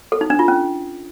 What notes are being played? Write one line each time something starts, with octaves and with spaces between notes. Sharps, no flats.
A4
D#4
D4
F4
C#4